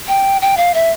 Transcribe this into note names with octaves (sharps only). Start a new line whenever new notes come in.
G5
G5
F5
E5